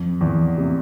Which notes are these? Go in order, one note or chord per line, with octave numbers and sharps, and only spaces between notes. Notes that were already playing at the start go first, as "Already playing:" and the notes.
Already playing: F2
E2
C3